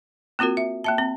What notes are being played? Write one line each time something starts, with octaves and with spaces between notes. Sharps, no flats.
A#3 C4 F4 F#4 A#4
E5
A#3 E5 A5
C4